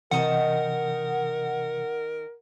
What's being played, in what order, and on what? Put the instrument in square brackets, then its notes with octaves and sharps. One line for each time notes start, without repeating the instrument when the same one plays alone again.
[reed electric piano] C3 E3 [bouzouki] D#3 D#4 A5 [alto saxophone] A#4 [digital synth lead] F#5